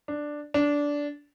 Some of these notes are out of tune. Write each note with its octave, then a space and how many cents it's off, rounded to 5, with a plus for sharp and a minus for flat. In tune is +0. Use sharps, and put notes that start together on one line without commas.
D4 +5
D4 -15